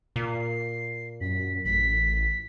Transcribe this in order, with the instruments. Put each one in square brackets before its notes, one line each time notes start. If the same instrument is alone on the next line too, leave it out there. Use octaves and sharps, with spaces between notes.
[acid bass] A#2 [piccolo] C7
[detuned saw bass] F#2 [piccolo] B6
[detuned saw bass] A1 [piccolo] B6